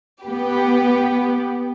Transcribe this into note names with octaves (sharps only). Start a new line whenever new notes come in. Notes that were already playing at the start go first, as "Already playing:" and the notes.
B3 G4 B4